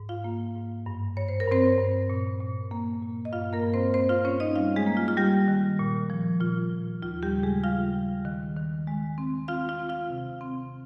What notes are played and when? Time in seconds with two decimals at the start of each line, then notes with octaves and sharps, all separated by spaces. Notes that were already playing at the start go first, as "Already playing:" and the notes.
Already playing: G#2
0.09 F4 F5
0.24 A#3
0.55 G#2
0.86 G2
1.17 G2 C#5
1.29 C5
1.40 A#4
1.48 G2 C4 C5
1.78 G2
2.09 A#2
2.40 A#2
2.71 A#3
3.02 A#2
3.25 D#5
3.33 G2 F4 F5
3.53 A#3 A#4
3.63 G2
3.74 C4 C5
3.94 G2 C4 C5
4.09 F4 F5
4.25 C4 C#4 C#5
4.40 D#4 D#5
4.55 G3 F4 F5
4.76 G#3 G#4
4.87 A#3
4.97 F4
5.08 F4
5.17 G3 G4
5.48 D#3
5.79 A#2
6.10 F3
6.40 A#2 F4
6.72 A#2
7.02 D#2 F4
7.23 G3 G4
7.33 C#3
7.43 G#3 G#4
7.64 G3 F4 F5
7.95 G3
8.25 D#3
8.56 D#3
8.87 G#3
9.18 C4
9.48 C4 F4 F5
9.69 F4 F5
9.79 C4
9.89 F4 F5
10.10 C3
10.41 C4